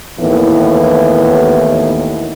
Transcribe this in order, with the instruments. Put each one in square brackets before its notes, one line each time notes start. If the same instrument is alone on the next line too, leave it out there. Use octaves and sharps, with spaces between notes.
[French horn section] D#2 A2 D#3 E3 B3